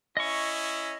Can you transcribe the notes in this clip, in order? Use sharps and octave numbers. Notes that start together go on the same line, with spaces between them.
C#4 E4 D#5 C#6